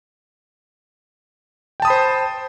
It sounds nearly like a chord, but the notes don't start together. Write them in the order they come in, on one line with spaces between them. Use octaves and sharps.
G5 A5 D#6 B5 C5